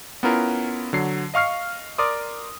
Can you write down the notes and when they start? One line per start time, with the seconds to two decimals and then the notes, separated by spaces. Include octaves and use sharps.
0.23 B3 C#4 E4 F4 A#4
0.93 D3 F#3 C7
1.34 D#5 F5 C#6 F6 C7
1.98 A#4 D5 C6 D6 D#6